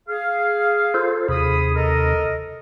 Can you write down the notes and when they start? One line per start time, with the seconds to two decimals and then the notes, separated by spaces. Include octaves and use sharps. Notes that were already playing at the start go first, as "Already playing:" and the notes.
0.09 G#4 F5
0.94 F4 A4 C5
1.29 D#2 C3 G#4 B5 D#6
1.75 A4 A#4 D#5